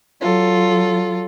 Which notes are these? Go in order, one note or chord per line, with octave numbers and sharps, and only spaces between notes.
F#3 F4 A4